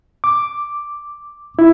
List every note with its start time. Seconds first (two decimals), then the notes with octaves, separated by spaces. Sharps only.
0.24 D6
1.59 E4